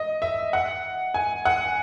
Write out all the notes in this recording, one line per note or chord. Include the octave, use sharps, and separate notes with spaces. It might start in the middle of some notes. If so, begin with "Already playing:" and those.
Already playing: D#5
E5
F#5
G#5
F#5